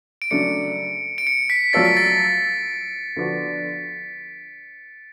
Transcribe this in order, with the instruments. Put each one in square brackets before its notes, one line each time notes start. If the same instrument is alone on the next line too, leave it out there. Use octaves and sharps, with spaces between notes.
[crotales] D7
[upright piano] C#3 F#3 A3 D4 [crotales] C#7
[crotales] D7
C#7
B6
[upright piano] F#3 A3 F4 A4 D5 [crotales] A6
[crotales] B6
A6
[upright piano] D3 F3 B3 D4 F#4